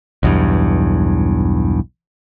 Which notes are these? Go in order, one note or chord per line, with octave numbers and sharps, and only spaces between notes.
B1 E2 G2